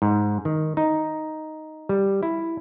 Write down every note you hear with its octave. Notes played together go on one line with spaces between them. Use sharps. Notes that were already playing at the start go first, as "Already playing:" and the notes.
G#2
D#3
D#4
G3
E4